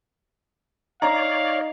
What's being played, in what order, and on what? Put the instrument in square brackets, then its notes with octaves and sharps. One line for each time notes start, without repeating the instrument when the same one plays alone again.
[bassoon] D#4 [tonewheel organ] C#5 D5 [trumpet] F5 [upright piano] A#5